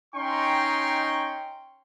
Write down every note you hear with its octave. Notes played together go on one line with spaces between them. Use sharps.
C#4 D#4 G5 A#5 C6 C#6